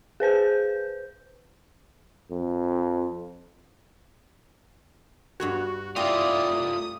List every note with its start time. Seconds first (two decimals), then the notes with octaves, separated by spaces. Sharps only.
0.20 G#4 B4 C5 G6
2.31 F2
5.40 G2 B3 F#4 C#5
5.96 A3 C4 E4 F4 D5 F5 A#5 D#6